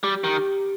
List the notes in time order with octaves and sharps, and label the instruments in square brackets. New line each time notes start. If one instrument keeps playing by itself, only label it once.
[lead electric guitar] G3 [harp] G4
[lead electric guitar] D#3